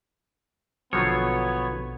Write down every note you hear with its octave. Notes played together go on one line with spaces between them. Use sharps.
A#1 B2 D3 F3 F#3 B3 F4 C#5